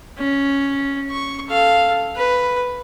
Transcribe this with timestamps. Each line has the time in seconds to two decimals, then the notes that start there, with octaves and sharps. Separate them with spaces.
0.18 C#4
1.10 C#6
1.48 A4 F5
2.16 B4